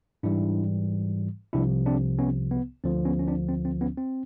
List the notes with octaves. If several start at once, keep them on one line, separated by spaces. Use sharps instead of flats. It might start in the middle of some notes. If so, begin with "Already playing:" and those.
G#2 E3 G3 D4 E4
C2 C3 F3 D4 E4
C4 D4
B3 C#4
B3
D2 D3 F3 C4
B3 C#4
C#4
C4 D4
C4
C4
B3 C#4
C4